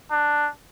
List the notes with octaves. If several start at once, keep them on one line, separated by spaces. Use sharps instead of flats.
D4